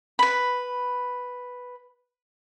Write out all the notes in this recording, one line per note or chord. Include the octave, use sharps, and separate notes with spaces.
B4 B5